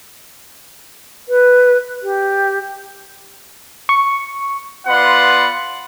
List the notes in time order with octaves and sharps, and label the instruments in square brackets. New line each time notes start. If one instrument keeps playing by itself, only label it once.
[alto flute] B4
G4
[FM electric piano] C#6
[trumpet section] B3 F4 B4 D5 F#5 C6